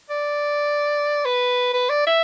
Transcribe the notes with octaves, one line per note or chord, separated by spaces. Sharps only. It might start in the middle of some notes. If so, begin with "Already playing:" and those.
D5
B4
B4
D5
E5